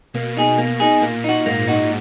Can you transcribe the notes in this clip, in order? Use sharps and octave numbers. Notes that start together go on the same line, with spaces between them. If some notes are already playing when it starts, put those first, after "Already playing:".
B2 A#3
D#4 G#4
B2 A#3
D#4 G#4
A#2 A#3
D#4 F#4
G#2 A#3
D#4 F#4